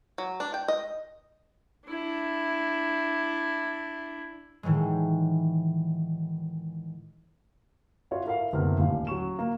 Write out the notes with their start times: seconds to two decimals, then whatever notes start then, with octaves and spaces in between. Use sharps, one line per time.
0.18 F#3
0.40 D4
0.54 G5
0.68 D#5
1.88 D4 E4
4.63 A2 D#3 E3 F#3 G#3
8.11 F4 F#4 C#5 E5
8.25 E4 A4 A#4 E5 F5
8.53 F#1 D2 C3 B3 F6
8.79 D#1 D#2 A2 F5
9.07 F#3 C#4 C#6 E7
9.39 A#3